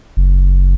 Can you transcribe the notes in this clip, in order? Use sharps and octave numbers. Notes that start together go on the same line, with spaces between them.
F#1